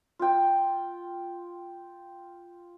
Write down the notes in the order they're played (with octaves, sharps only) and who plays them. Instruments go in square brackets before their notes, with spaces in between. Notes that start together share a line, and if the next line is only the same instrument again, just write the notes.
[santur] F4 G5